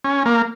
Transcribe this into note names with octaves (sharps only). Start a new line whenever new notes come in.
C#4
A#3